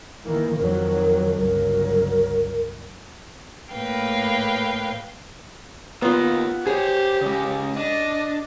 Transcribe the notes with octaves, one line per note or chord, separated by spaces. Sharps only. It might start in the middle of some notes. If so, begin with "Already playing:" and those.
D#3 E3 A#3
F2 D#3 F#3 A#4
G1 C#2 F#3 A#4
A2 A#3 B4 F5 G5
A#3 B3 D#4 F4
G4 G#4 C5 C#5
C#3 G#3
D4 D#5